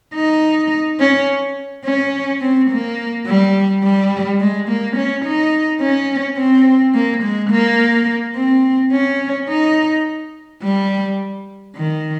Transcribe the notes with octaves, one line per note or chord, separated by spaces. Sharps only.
D#4
C#4
C#4
C4
A#3
G3
G3
G#3
A#3
C#4
D#4
C#4
C4
A#3
G#3
A#3
C4
C#4
D#4
G3
D#3